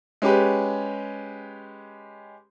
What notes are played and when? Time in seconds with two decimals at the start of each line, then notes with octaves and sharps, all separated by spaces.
0.22 G#3 C#4 G4 B4